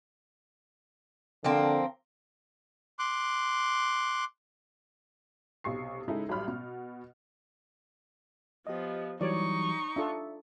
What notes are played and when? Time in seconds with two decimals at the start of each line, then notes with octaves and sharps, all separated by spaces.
1.44 D3 F3 A#3 C4
2.99 C6 D6 F#6
5.64 B1 C3 C#6 C7
6.08 C#3 G#3 D#4 E4 G#4 A4
6.29 A1 F#3 G3 B5 F6
6.48 B2 B3
8.67 F3 B3 G4 D#5
9.21 E3 F#3 G3 D#4 C#5 D5 C#6
9.96 D4 F4 A4 E5